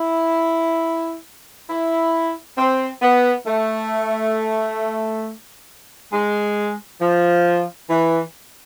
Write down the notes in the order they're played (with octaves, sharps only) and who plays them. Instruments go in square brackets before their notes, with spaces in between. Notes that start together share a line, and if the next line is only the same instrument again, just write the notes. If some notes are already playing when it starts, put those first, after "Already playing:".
Already playing: [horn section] E4
E4
C4
B3
A3
G#3
F3
E3